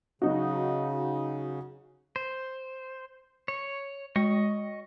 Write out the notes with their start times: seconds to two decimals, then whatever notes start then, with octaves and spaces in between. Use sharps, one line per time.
0.22 C#3 F#3 D#4 F#4
2.16 C5
3.48 C#5
4.16 G#3 D#5 C#6